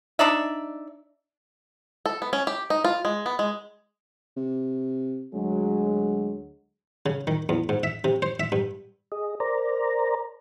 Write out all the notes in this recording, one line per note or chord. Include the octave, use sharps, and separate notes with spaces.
D4 D#4 D5 E5
A4
B3
C#4
G4
D#4
F4
G#3
B3
G#3
C3
D2 F#3 G#3
C#3
D#3
E2
G#2
E5
C3
C5
E5
G2
G#4 D#5
A#4 C5 D5 A#5